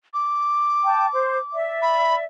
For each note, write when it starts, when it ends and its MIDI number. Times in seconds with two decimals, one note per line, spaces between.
0.14 1.56 86
0.84 1.06 79
0.84 1.06 81
1.13 1.37 72
1.53 2.24 74
1.53 2.24 76
1.82 2.15 83